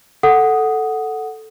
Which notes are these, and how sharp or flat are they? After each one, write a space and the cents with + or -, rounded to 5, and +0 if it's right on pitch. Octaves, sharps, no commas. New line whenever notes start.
A4 +0 F#5 +0 D#6 +0